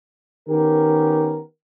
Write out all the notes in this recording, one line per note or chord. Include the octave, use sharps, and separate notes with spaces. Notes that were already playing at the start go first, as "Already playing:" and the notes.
D#3 B3 C#4 G4 A#4